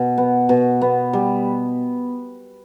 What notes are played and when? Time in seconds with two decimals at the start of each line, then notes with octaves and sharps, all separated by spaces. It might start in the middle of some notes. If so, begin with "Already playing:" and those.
Already playing: B2
0.18 B3
0.49 B2
0.81 B3
1.13 G3